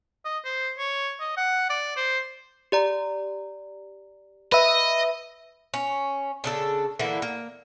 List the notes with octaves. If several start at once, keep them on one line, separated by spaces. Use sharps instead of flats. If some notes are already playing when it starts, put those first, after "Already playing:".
D#5
C5
C#5
D#5
F#5
D5
C5
G4 D5 A#5
B4 D#5 E5
C#4
C#3 D4 A4
D3 E3 A#3 E4
A#3